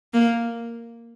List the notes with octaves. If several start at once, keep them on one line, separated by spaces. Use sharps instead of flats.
A#3